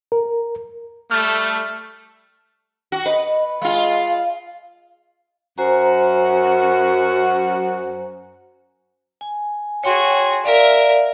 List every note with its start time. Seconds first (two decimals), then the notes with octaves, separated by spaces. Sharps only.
0.12 A#4
1.11 G3 A3 F6 A6
2.92 F#4
3.06 B4 D#5
3.62 G#3 F4 F5
5.58 F#2 F#4 C5 G#5 A#5
9.21 G#5
9.84 F#4 G#4 C#5 G5 C6
10.45 A#4 D5 E5 F5